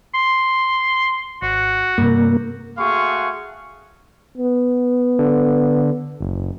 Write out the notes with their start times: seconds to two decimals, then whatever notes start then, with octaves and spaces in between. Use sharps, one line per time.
0.14 C6
1.42 G#1 F#4
1.98 G2 C3 A#3
2.78 A3 F#4 G#4 F5 C6 C#6
4.38 B3
5.19 D3
6.21 F#1